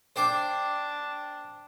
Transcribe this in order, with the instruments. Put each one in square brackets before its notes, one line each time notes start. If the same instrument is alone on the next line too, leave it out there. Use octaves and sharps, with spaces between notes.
[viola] D4 [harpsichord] C5 G5 D6